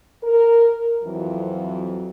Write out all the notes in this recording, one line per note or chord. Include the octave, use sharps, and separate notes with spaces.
A#4
F2 E3 F#3